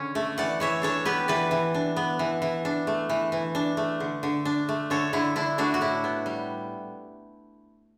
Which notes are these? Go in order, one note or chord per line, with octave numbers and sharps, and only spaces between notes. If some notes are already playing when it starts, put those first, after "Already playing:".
Already playing: D3 C#4
A3
E3 D5 F#5
E3 C#5 E5
D4 A4 C#5
B3 G4 B4
E3 B4 D5
E3
D4
B3
E3
E3
D4
A3
E3
E3
D4
A3
D3
D3
D4
A3
D3 A4 C#5
D3 E4
D4 E4
A3 D4 F#4
F#4
A2 E4
B3
G3